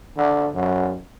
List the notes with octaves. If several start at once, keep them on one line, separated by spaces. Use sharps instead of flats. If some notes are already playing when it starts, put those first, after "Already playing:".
D3
F#2